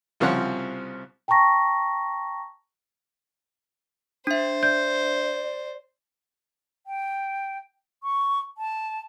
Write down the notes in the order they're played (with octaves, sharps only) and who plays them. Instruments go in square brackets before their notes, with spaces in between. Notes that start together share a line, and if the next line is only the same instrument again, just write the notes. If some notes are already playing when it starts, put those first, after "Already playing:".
[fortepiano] C2 C#3 F3 C4 C#5 F#5
[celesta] G5 A5 A#5 C#6 A#6
[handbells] D4 E5 [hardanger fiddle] C5
[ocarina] D5 [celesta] G6
[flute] G5
C#6
A5